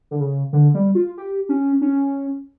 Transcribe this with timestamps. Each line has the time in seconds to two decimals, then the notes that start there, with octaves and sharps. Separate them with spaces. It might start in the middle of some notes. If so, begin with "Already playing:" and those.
0.11 D3
0.20 C#3
0.53 D3
0.74 G3
0.95 F4
1.17 G4
1.49 C#4
1.81 C#4